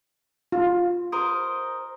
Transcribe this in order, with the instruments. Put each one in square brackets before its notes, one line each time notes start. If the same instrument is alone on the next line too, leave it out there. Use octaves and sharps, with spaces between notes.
[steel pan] F4
[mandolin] A#4 C5 D#5